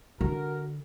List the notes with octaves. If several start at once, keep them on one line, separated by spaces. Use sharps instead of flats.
D3 F#4 A#4